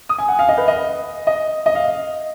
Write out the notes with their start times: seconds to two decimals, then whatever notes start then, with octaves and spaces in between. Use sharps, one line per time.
0.09 D#6
0.18 G#5
0.28 F#5
0.39 F5
0.49 D#5
0.58 B4
0.68 D#5
1.27 D#5
1.66 D#5
1.75 F5